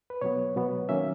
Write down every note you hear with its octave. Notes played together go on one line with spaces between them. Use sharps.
B4
B2 F#3 B3 C#5
B2 F#3 B3
D#3 F#3 A#3 C#4 E5